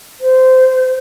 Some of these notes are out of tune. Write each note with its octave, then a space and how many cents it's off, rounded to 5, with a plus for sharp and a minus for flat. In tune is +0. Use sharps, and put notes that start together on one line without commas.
C5 -15